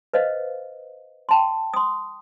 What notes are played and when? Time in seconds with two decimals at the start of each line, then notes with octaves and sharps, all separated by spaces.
0.14 B4 C5 D#5 F5
1.29 G5 A5 C6
1.74 C6 D#6